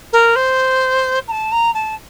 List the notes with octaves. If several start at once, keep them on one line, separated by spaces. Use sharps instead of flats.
A#4
C5
A#5
A5
A#5
A5